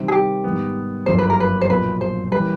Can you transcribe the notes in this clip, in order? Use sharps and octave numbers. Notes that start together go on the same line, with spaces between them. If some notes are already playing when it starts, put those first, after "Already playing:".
Already playing: C3 D#3 G3 C4
G#4
G4
G#2 D#3 G3 B3
G1 F#2 D3 F3 A#3 C5
B4
A#4
B4
C5
B1 A#2 F3 B4
C5
E3 G3 A#3 C#4 B4